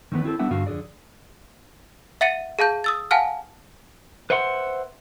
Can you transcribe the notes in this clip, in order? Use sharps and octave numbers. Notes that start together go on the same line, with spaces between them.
D#3 E3 G#3 B3 B4
C4 E4 G4 A4
G3 B3 D4 E5 F#5
G2 D3 F#4 F5
F2 D3 G#4 D5
E5 F#5 A6 C#7 D#7
G#4 F5 A5 G6
D#6 E6 A6
F5 F#5 G#5 A5 F6
B4 C5 E5 F#5 B5 C6